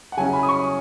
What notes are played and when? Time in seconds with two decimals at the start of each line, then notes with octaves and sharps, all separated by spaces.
0.12 F#5
0.17 C#3 F#3 C#4 E4 G#5
0.33 B5
0.43 D#6
0.49 C#6